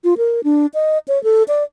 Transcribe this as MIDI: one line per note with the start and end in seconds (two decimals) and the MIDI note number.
0.04 0.14 65
0.18 0.44 70
0.44 0.66 62
0.74 0.98 75
1.08 1.22 73
1.24 1.43 69
1.48 1.63 74